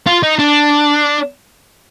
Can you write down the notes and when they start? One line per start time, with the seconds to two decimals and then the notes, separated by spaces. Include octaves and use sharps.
0.07 F4
0.23 D#4
0.39 D4